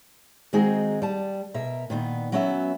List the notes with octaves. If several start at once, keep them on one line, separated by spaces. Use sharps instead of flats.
D#3 G#3 C4 D#4 F#4 G#4
G3 A5
B2 A#4 E5
A#2 D#3 B3
F#3 B3 C#4 F#4 D5 E5